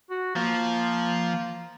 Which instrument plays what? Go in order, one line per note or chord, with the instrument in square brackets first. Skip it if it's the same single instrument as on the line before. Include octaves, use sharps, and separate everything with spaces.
[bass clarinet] F#4
[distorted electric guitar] F3 [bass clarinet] A#3